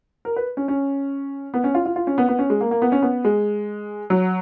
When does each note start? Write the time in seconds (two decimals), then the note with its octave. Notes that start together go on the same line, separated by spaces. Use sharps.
0.25 A#4
0.36 B4
0.57 C#4
0.68 C#4
1.54 B3
1.64 C#4
1.75 F4
1.86 F4
1.96 F4
2.07 C#4
2.18 B3
2.29 B3
2.39 C#4
2.50 G#3
2.61 A#3
2.71 A#3
2.82 B3
2.92 C#4
3.02 B3
3.24 G#3
4.10 F#3